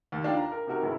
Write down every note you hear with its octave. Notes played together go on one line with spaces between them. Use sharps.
D#2
D4 D#4 F4 F5 G5 A5
A#5
A#4
C3 D#4 F#4 A#4
G1 C#3 E4